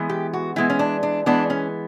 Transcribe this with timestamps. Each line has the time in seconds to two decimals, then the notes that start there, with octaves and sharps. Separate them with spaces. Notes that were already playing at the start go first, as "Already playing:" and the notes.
Already playing: E3 G#3 B3
0.10 G4
0.33 F#4
0.56 E3 G#3 B3 E4
0.70 C#4
0.79 D4
1.03 D4
1.26 E3 G#3 B3 D4
1.50 C#4